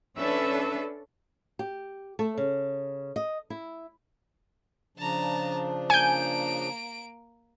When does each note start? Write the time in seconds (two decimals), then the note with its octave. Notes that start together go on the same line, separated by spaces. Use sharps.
0.18 C#4 D4 A4 B4 E5
1.59 G4
2.19 A3
2.38 C#3
3.16 D#5
3.50 E4
4.98 C#3 F3 D4 A5 A#5
5.90 A#3 G#5 G6 D7